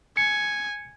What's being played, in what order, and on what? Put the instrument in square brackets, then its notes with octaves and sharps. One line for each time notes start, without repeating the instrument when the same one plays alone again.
[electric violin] G#5 [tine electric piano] C#7